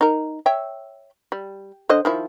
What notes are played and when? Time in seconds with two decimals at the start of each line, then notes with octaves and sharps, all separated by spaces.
0.01 D#4 A#4
0.46 C#5 E5 G5
1.32 G3
1.89 D3 C5 D#5
2.05 D#3 F3 E4